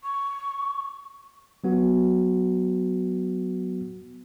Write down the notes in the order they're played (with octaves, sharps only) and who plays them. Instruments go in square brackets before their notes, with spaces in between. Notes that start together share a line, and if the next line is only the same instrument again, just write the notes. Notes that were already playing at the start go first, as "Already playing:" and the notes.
[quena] C#6
[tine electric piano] F#3 B3 F#4